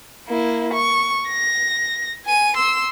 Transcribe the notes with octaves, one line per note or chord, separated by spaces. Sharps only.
A#3 E4
C#6
A#6
G#5 D#7
C6 E6